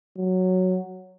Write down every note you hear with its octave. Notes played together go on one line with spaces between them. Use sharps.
F#3